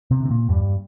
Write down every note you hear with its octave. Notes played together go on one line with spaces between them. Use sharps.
C3 C4
D3
C4
A#2 A#3
E2 G2 G3